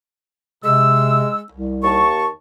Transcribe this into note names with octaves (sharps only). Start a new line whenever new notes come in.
C3 G#3 E6
C2
D#2 A5 C#6